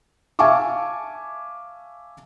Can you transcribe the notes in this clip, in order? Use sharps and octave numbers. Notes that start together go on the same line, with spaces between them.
E5 F5 G#5 A5 C#6 D6